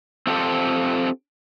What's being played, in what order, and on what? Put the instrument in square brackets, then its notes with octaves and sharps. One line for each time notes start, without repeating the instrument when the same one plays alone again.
[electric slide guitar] C4 F4 G4 A4 C5